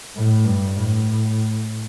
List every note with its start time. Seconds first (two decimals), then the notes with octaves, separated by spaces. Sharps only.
0.15 A2
0.45 G2
0.76 A2